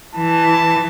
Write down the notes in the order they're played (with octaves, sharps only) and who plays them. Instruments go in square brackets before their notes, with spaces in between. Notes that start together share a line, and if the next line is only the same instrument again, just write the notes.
[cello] E3 [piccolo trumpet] A5